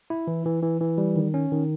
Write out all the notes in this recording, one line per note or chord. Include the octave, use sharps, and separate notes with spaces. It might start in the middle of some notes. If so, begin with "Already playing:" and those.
E4
E3
E3
E3
E3
G3
D#3
C#4
D#3